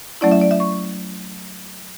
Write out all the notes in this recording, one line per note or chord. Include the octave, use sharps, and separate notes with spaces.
F#3 A3 C#4 E4 D5
E5
D5
E5
C#6